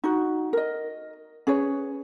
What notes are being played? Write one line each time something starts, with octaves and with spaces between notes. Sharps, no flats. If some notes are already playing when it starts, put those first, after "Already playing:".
D#4 F#4
A#4 D#5
C#4 G#4 B4 C#5